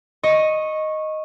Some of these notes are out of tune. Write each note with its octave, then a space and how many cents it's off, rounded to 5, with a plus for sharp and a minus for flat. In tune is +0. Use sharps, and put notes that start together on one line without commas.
D#5 +0 C#6 -15